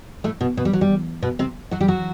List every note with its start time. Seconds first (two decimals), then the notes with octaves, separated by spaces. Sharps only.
0.24 A2 A3
0.41 B2 B3
0.57 B2 B3
0.65 G3
0.73 F#3
0.81 G3
1.23 B2 B3
1.39 C3 C4
1.71 F#3 F#4
1.81 G3 G4
1.88 F#3 F#4